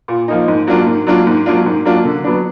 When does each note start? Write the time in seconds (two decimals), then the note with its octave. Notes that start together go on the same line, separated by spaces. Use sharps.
0.08 A#2
0.28 F3 A#3 D#4
0.48 G#2
0.67 F#3 A#3 D4 F4
0.86 G#2
1.07 F#3 A#3 D4 F4
1.27 G#2
1.46 F#3 A#3 D4 F4
1.66 G#2
1.85 F#3 A#3 D4 F4
2.05 D3
2.24 F#3 B3 D4